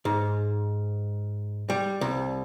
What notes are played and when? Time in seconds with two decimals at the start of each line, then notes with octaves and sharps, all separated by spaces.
0.05 G#2
1.70 G3
2.01 C2